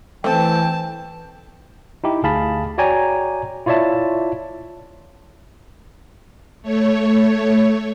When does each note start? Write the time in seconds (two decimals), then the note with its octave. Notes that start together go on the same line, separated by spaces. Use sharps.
0.24 E3 A3 C4 G5 A5
2.04 D#4 E4 G4
2.23 D2 G#4 F5 A5 B5
2.78 F#4 C#5 D5 G5 G#5 A#5
3.66 E4 F4 C#5 D5 E5 A5
6.62 A3 C#5